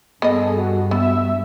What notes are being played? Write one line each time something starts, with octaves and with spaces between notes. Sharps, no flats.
G2 B3 G#4 A4 D#5
F#4
B3 E5 E6